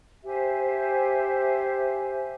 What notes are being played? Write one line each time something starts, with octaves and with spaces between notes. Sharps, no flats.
G4 C5 E5 G#5